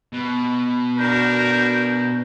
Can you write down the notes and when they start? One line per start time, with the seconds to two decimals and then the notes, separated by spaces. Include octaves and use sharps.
0.13 B2
0.98 D4 F#4 A#4 G6